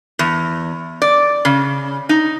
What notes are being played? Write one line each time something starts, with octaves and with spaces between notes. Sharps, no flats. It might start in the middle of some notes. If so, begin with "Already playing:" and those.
E2
D5
C#3
D#4